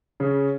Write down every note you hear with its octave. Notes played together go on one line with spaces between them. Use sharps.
C#3